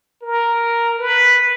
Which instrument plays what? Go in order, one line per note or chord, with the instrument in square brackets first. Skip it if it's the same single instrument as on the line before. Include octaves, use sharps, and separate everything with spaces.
[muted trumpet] A#4
B4